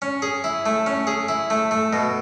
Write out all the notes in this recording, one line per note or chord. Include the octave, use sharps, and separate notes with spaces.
C#4
G#4
E4
A3
C#4
G#4
E4
A3
A3
B2